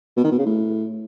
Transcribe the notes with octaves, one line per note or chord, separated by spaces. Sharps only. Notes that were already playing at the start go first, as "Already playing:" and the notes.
B2
D#3
B2
C#3
A2